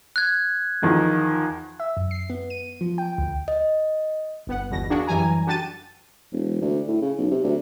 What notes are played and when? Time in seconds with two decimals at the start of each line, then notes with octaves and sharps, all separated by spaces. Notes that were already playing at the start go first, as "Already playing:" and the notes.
0.16 F#6 G#6
0.82 E2 D#3 F3
1.80 E5
1.97 F#2
2.11 C7
2.30 B3
2.50 D#7
2.81 F3
2.98 G5
3.18 D2
3.48 D#5
4.47 G1 B3 F#5
4.70 G1 E2 B2 A#6
4.90 A#3 D4 F#4 G#4
5.07 F#2 E3 G3 G#5 A#5
5.46 D3 F#4 G4 A5 A6 D#7
6.32 E1
6.61 D2
6.88 A2
7.01 C#3
7.18 B1
7.31 C3
7.44 D2